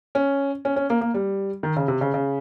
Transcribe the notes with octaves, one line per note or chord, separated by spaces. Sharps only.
C#4
C#4
C#4
A#3
A#3
G3
D#3
C#3
C3
C#3
C#3